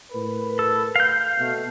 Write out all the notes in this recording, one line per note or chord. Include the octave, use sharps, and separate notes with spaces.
A2 A#4 B4
A4
F5 G6
B2 A3